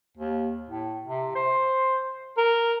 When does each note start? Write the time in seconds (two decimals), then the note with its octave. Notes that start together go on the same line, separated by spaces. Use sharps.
0.17 D#2
0.69 A2
1.08 C3
1.36 C5
2.38 A#4